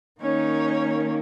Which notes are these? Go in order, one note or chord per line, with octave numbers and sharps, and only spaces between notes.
D#3 A#3 C#4 D#4 C#5